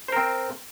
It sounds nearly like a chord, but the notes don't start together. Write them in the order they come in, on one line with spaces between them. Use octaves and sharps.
C5 A#4 C4